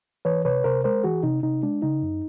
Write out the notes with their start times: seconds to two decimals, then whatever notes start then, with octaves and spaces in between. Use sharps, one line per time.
0.25 E3 B4 C#5
0.45 C3 B4 C#5
0.64 C3 A#4 C5
0.84 G#3 A#4 C5
1.04 E3 F#4 G#4
1.23 C3 D#4
1.43 C3 D#4
1.63 G#3 D4
1.82 C#3 D#4
2.03 F#2